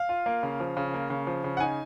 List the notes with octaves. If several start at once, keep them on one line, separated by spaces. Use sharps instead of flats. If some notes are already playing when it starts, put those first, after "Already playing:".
Already playing: F5
F4
A#3
C#3
F3
C#3
A#3
C#3
F3
C#3
F#5
D#4 G#5